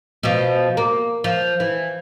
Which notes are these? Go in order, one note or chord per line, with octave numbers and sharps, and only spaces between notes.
B2 F3
A#3
F3
E3